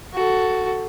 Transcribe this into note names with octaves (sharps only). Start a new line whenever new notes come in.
F#4 A4